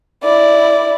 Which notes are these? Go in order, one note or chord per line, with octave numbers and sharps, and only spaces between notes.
E4 D5